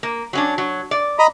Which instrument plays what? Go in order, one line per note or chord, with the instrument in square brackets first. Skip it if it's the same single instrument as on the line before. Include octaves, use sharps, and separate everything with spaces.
[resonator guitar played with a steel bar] A#3
F#3 C#4 D4
F#3
D5
[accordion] D#5 A#5 B5